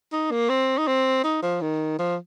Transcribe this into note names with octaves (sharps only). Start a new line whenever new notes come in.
D#4
A#3
C4
D#4
C4
D#4
F3
D#3
F3